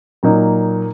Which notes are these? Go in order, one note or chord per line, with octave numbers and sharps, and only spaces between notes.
A#2 F#3 A#3 D#4